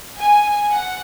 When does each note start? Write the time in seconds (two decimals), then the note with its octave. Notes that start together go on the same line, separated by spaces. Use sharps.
0.18 G#5
0.71 F#5